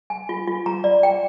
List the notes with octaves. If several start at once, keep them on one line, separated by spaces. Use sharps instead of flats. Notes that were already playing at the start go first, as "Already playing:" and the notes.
G#5
F4
F4
A#5
D5
G5